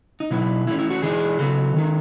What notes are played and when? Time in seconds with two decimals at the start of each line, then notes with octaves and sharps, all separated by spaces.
0.20 D#4
0.31 B2 F#3 B3 D#4 E4
0.67 E3 A3 C#4 E4
0.79 E4
0.90 F#4
1.02 E3 G#3 D#4 G#4
1.38 C#3 F#3 B3 A4
1.74 D#3 G#3 D#4